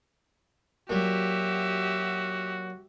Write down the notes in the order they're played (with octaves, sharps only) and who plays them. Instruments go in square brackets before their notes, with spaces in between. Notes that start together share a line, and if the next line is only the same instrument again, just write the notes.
[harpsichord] A#2 F#3 [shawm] F#4 [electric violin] G4 E5